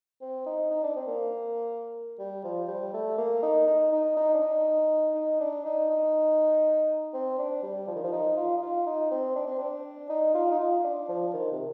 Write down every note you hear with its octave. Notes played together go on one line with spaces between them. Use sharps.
C4
D#4
D#4
D4
C4
A#3
G3
F3
G3
A3
A#3
D#4
D#4
D#4
D#4
D4
D#4
D#4
D4
D#4
D#4
C4
D4
G3
F3
D#3
F3
D#4
F4
D#4
F4
D#4
C4
D4
C4
D4
D#4
F4
D#4
F4
D4
F3
D#3
C3